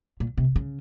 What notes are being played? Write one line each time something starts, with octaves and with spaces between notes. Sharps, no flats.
A#2
C3
C#3